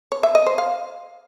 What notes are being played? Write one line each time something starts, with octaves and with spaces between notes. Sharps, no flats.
C#5
E5
D#5
C5
F5